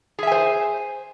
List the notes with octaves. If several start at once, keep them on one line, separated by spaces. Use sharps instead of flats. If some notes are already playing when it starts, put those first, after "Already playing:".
G#4 C5 E5 G#5